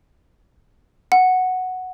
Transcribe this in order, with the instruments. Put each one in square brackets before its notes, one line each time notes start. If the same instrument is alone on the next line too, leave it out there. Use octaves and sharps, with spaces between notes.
[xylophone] F#5